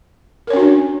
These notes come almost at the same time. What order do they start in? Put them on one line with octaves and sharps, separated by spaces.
A#4 C#5 C#4 F#4 D4